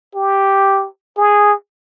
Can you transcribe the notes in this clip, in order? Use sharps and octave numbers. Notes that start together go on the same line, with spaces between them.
G4
G#4